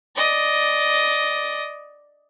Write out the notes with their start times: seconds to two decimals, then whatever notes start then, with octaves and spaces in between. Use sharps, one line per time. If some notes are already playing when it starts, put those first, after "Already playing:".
0.15 D5 D#5